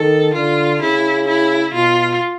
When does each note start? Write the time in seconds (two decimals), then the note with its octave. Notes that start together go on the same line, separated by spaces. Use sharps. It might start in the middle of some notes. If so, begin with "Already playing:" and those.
Already playing: D#3 A4
0.34 D3 F4
0.82 C#3 E4
1.28 E4
1.74 B2 F4